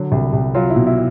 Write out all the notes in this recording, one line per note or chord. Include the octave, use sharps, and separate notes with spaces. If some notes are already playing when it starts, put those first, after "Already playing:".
Already playing: D3 F#3
C2
C2
F#3 F4
E4
B2
E4